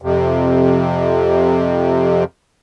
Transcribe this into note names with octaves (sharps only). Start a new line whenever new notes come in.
F2 C3